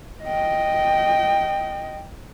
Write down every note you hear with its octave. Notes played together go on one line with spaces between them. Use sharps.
D#5 G5